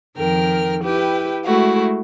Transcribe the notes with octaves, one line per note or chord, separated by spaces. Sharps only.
F2 D#3 A#4 G5 F6
E4 G4 B4 G5
G#3 A3 E4 F#4